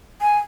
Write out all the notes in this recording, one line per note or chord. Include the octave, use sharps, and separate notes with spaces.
G#5